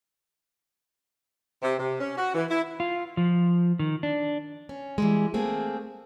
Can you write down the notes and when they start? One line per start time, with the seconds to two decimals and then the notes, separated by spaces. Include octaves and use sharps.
1.63 C3
1.79 C3
2.00 C#4
2.17 F#4
2.34 E3
2.49 E4
2.80 F4
3.17 F3
3.79 D#3
4.03 D4
4.69 C#4
4.98 E3 G3 G#3
5.34 A3 A#3 C4 G#4